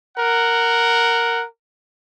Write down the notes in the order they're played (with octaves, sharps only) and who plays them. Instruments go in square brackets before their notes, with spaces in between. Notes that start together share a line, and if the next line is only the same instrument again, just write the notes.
[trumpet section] A#4 F#5